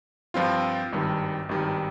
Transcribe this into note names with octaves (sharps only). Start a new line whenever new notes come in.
G2 F3 C4 F4
G#1 G2 D#3 G3
G#1 G2 D#3 G3